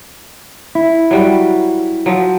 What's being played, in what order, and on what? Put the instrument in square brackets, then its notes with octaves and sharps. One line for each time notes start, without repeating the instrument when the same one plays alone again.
[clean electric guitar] E4
[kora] F#3 G3 F#4
F3 F#3